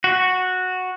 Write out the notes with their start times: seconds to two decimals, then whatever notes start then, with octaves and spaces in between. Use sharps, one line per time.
0.04 F#4